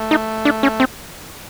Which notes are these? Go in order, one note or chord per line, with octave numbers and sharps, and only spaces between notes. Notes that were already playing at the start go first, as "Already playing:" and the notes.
Already playing: A3
D#4
D4
C#4
C4